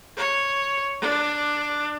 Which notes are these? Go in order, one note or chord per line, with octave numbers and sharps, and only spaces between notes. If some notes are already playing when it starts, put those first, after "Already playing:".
C#5
D4